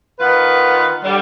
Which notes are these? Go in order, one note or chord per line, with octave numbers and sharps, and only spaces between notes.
D#3 B3 F4 B4
D3 G3